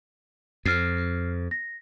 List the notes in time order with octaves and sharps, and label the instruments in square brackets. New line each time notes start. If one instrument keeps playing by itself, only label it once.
[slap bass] F2 [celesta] F6 C7
[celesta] A#6